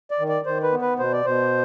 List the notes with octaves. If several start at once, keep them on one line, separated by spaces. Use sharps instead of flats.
D5
D#3
D5
D#3 C5
B4
B3
B4
B2 C5
D5
B2 C5